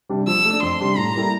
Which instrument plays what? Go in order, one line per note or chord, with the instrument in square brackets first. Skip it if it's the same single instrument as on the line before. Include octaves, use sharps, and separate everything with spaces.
[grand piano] C3 G3 D4
[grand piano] F3 [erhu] E6
[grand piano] A3 D4
[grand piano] F2 [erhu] C6
[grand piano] C3 G3 D4
[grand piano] A2 [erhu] A#5
[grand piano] G3 A#3 E4 A4